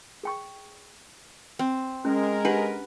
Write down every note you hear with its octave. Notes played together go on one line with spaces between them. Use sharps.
G#4 G5 C#6
C4
G#3 C#4 A#4
D4 G4 B4 F#5